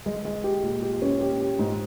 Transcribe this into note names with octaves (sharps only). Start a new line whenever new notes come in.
G#3
G#3
G4
A#2
G4
C#4
G4
G4
G#2